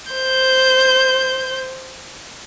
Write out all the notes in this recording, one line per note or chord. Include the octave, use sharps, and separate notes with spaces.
C5 G6